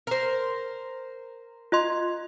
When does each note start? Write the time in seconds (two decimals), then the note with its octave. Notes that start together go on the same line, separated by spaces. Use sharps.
0.07 A#4 C5
1.72 F4 D#5 C6